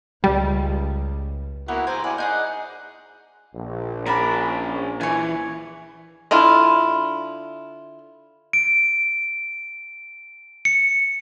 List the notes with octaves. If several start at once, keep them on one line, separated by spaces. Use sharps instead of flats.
C#2 G3
A#3 B3 E4 F#4
C5 G5 G#5 A#5
E4 D5 F#5 G#5
D#4 G#4 D5 F#5
A#1
C#4 A#4 D5 A5 B5
E3 C#5 G#5
D3 D4 E4 F4
D7
C#7